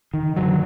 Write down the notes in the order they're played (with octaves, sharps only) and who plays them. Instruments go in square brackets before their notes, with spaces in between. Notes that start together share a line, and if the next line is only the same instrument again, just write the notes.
[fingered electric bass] D#3
F#2 D3 F#3